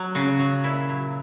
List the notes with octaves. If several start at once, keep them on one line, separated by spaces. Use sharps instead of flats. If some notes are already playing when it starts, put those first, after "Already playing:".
Already playing: F#3
C#3 F#4
F#3
A#2 E4
F#3